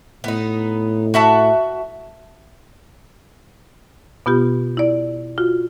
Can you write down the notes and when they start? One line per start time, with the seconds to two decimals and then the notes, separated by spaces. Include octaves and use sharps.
0.24 A2 B3 D#4
1.14 F#4 E5 A5
4.26 B2 B3 F4 G4
4.77 E4 D5
5.38 F4 F#4